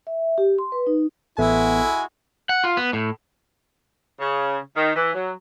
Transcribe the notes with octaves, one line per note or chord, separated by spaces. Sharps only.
E5
G4
C6
B4
D#4
A1 G#3 B3 E4 F#4 A4 E5 G#5
F#5
F4
B3
A2
C#3
D#3
E3
F#3